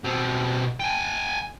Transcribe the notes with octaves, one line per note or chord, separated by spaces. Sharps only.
B2 C4
G5 G#5